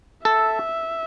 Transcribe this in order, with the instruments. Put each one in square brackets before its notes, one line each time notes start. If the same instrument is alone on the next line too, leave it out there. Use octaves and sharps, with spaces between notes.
[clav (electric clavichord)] A4 [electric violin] E5